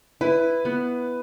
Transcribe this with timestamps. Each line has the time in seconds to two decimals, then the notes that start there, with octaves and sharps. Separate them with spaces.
0.21 E4 B4
0.65 B3